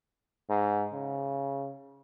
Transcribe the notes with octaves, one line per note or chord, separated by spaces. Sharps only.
G#2
C#3